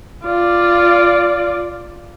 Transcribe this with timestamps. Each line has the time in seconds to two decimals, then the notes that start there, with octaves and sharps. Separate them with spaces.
0.24 F4 D5